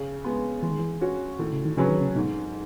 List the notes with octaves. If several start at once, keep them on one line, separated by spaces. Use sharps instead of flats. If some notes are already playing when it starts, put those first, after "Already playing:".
Already playing: C#3
G#3 B3
E3 G#3
D#3
E3
C#4 F#4
A2 D#3
C#3
D#3
C#3 F#3 C#4 G#4 B4
D#3
C#3
G#2 B2